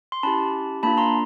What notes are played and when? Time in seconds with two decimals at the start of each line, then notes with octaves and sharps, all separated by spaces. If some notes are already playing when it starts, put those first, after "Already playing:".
0.12 C6
0.23 C#4 E4 G4 A5 B5
0.83 A#3 D4 F4 A5 B5
0.97 A#5 C6